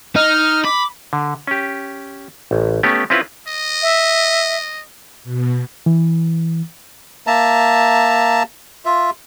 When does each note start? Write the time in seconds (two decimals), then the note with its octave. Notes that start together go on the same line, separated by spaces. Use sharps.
0.16 D#4 F6
0.65 B5 D6
1.13 D3
1.47 C#4 G4
2.51 A1
2.83 A3 B3 C#4 G4
3.10 C4 C#4 E4 F4 B4
3.48 D#5
3.82 E5
5.24 B2
5.86 E3
7.27 A#3 E5 A5 A#5
8.85 F4 E5